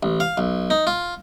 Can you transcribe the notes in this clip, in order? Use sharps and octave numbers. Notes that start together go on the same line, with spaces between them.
A1
F5
B1
D#4
F4